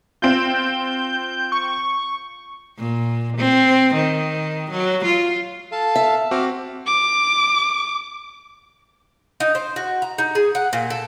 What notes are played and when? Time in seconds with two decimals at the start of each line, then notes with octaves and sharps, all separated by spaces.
0.22 C4 F4 G6
1.52 C#6
2.78 A#2
3.37 C4
3.94 D#3
4.70 F#3
5.04 F4
5.72 A4 F5 A5
5.96 E5
6.31 C4 F#4 D6 F6
6.87 D6
9.40 D#4
9.55 C5
9.76 F#4
10.02 A#5
10.18 D#4
10.35 G#4
10.55 F#5
10.73 A#2
10.90 A4